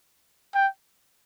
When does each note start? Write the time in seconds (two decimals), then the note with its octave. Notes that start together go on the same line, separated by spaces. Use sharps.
0.55 G5